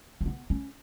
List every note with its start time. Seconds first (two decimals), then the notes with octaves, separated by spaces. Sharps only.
0.21 C4
0.26 B3
0.50 C#4